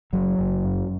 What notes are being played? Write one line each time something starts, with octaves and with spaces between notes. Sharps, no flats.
F#1 F#3
F#1
F#2